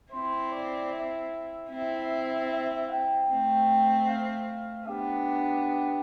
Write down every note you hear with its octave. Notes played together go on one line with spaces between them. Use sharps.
C4 E4 C5
D5
E5
C4 E4
E5
G5
A3 C4
F5
B3 D4 G4